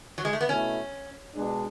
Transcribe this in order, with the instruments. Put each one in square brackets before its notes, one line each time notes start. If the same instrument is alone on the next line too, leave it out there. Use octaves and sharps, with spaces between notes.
[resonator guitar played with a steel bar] F#3
G#3
A3
B3
[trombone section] B2 A3 E4 [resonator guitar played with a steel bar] C#4
[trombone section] B2 G#3 D4